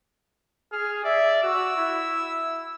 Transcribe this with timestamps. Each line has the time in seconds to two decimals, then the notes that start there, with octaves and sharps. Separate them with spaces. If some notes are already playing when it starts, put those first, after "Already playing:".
0.72 G#4 F6
1.05 D5 E5
1.43 F#4 E6
1.77 E4